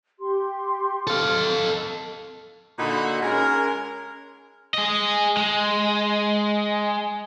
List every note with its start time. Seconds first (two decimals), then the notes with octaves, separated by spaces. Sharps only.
0.20 G4 C6
1.07 A4 F5
2.78 A#2 D3 D#4 F#4 B5
3.22 G#3 C#4 A#4
4.74 G#4 D#5
5.37 G#3